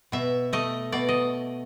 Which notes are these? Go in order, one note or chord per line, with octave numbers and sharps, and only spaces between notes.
B2 E5
A3 D#5
B2 D5
D#5